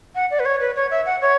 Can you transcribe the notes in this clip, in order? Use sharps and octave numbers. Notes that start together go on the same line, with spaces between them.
F#5
D5
B4
C#5
B4
C#5
E5
F#5
C#5